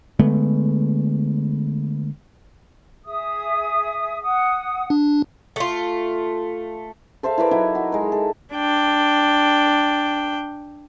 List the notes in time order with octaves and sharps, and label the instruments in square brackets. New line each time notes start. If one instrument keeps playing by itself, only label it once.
[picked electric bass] D3 G#3 A3 B3
[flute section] G#4 E5 D#6
F#5 D#6
[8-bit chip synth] D4
[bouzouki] A3 F4
[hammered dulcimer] A4 C5 E5 F5
E4 A#4 B4 D5
F#3 D#4 E4 A#5
F#4
G#3 A#4
A4
[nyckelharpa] D4 G5